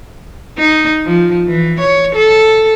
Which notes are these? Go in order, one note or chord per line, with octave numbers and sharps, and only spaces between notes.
D#4
F3
E3
C#5
A4